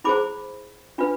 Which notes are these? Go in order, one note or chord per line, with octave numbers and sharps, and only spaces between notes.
E4 G#4 C5 B5 D6
D4 F4 B4